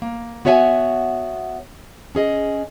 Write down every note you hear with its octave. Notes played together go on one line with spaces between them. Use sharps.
A#3
B3 F#4 C#5 E5 F5 G#5
C#4 G#4 D#5